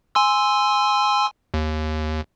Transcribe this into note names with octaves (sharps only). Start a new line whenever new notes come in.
G#5 C6 E6
D#2